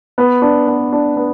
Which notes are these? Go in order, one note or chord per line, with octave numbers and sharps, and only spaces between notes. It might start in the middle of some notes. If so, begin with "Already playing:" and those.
B3
D4
B3
D4
B3